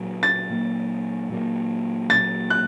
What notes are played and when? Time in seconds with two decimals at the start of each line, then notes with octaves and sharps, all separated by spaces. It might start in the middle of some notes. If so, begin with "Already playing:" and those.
Already playing: A#2 F#3 A#3
0.23 A6
0.50 A#2 F#3 A#3
1.30 A#2 F#3 A#3
2.10 A#2 F#3 A#3 A6
2.50 F#6